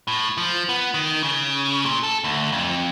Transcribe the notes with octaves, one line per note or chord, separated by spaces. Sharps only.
A2
F3
B3
D#3
C#3
A#2
A4
D2
F2